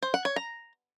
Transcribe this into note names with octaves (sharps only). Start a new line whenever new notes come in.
C5
F#5
C#5
A#5